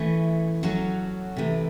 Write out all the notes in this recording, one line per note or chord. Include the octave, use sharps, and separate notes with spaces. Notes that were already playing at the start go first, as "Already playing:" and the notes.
Already playing: E3 A3 C#4
F#3 C#4 F#4 A4
C3 E3 A3